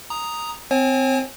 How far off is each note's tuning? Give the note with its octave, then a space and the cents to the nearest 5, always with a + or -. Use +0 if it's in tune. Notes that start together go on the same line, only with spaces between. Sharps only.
A#5 +0 D#6 +0
C4 -15 C#5 -45 G#5 +5